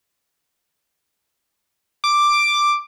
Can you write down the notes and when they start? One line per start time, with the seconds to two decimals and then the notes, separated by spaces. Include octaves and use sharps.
2.04 D6